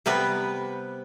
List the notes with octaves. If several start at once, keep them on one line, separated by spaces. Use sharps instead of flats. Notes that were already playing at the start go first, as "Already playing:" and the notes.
C3 G3 B3 B4